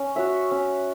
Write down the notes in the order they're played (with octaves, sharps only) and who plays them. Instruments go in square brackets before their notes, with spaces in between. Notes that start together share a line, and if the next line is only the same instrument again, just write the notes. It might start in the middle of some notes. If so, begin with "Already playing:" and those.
Already playing: [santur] C#4
F#4 C#5 E5
C#4